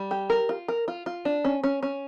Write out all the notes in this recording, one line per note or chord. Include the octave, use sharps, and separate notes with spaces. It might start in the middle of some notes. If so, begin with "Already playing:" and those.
Already playing: G3
G4
A#4
F4
A#4
F4
F4
D4
C#4
C#4
C#4